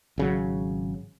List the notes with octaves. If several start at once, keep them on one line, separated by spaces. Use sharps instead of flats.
G#1 C#3 F#3